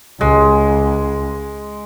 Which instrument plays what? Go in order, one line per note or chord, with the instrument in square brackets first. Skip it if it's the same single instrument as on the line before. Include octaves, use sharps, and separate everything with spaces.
[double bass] C#2 [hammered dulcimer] G#3